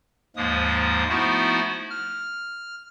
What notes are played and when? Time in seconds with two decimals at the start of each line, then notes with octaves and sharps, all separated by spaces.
0.36 D#2 G#2 F3 G#3 A#3 D#6
1.09 F3 A3 B3 D#4 E4 F#4
1.90 F6